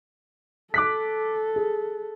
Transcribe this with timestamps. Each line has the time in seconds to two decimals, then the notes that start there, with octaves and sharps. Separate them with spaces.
0.74 A4 D6 F#6 B6
1.56 G#4